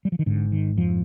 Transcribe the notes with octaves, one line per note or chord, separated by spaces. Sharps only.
G3
F3
D#3
G#1 G#2 D3
D#3
F2 F3